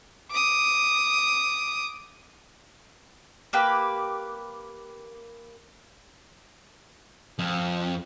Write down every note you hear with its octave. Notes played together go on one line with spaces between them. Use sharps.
D6 D#6
A#3 G4 B4
F2